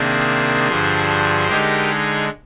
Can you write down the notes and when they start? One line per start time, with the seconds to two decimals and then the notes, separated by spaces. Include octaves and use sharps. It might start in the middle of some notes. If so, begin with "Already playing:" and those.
Already playing: C3 D#3 A#3 D4 G#4 C5
0.68 G2 D3 F3
1.48 D3 G#3 D#4 G4 A#4
1.90 G#4